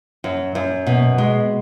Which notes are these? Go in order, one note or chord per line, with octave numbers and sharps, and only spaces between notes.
F#2
F#2
B2
G#3